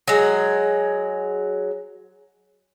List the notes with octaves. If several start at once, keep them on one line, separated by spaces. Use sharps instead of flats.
F#3 G#3